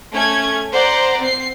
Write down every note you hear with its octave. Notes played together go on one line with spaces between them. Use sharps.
A3 C#4 G#6
C5 D5 F#5 A#5
C4 C7